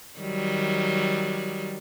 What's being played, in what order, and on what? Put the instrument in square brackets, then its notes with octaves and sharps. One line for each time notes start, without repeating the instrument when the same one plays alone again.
[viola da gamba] D#3 F#3 G3